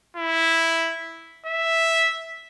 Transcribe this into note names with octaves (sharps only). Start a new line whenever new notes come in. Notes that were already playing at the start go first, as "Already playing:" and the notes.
E4
E5